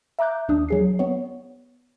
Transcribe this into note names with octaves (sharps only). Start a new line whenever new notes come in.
E5 A#5 D6 F#6 G6
D#2 D4 D#6
F#3 G#4 C7
B3 C#5